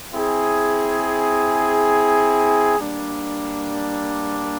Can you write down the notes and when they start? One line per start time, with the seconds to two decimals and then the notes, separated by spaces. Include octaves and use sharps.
0.14 C4 E4 G#4
2.79 G3 A#3 D4